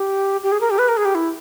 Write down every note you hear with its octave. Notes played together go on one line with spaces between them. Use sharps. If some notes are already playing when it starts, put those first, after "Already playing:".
Already playing: G4
G4
G#4
A#4
G4
B4
A#4
G#4
G4
E4